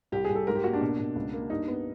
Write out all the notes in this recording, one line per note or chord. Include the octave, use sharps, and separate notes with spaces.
C2 G4
G#4
C2
A4
G#2 A#4
G4
A#3 F#4
D4
B2
B2
C#2
A#3
G2 D#4
B3